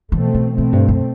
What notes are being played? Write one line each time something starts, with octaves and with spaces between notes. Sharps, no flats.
B2 E3 A3 C4
E3
B2 E3 A3 C4
G2
F#2